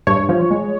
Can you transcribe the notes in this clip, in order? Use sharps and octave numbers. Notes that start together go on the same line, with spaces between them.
G2 C#5
F3
G#3